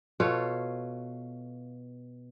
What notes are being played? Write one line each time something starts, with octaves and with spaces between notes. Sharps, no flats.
B2 F4 A4 C#5